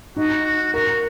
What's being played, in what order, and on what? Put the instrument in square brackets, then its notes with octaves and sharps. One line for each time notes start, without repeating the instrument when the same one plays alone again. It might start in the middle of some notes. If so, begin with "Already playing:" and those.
[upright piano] D#4 [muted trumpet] F#4
[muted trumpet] F#4
[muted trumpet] F#4 [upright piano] A#4